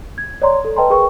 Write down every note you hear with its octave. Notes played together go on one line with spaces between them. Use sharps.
G#6
C#5 D5 A#5 C6
A4
B4 D#5 G5 A5 A#5 C6
G#4 A#4 B4 G5 C#6